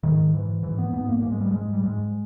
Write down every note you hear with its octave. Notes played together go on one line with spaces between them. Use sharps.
G#2 D#3
G#2 E3
G#2 E3
B3
G#2 B3
A#3
G#2 A#3
G#3
G3
G#2 G#3
G3
G#2 G#3